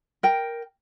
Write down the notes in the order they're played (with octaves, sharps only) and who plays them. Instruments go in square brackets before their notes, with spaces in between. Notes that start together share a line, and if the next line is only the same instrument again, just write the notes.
[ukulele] A#4 G5